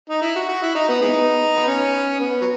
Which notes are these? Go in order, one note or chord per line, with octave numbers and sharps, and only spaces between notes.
D#4
E4
F#4
F#4
E4
D#4
B3
G#3 B3 D#4
B3
C#4
B3
F#3